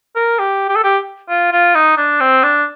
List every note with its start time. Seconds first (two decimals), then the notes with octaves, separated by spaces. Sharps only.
0.15 A#4
0.39 G4
0.69 G4
0.76 A4
0.84 G4
1.29 F4
1.52 F4
1.75 D#4
1.97 D4
2.20 C4
2.43 D4